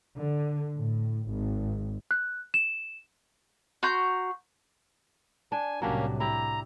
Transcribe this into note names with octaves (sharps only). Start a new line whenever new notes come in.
D3
A2
G#1
F#6
E7
F#4 A#5 C6 G6
D4 G#5
C2 A2 F#3 A#3 C#4 D4 G4
E4 G4 A#5